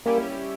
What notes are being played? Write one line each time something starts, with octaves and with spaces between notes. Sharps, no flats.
G3 A#3 C#4 E4 G4